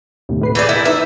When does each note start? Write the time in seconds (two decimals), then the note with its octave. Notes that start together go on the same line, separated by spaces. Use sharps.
0.29 D#2 A2 C3
0.42 A2 B4 C7
0.55 E3 G#4 D5 G6
0.69 E4 A#4 E5 G6
0.85 D#4 E4 B4 E5